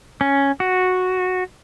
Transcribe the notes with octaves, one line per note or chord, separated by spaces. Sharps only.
C#4
F#4